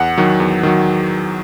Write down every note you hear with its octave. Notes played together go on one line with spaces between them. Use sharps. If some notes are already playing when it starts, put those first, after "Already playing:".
Already playing: E2 F#5
D#3 F#3
E2
D#3 F#3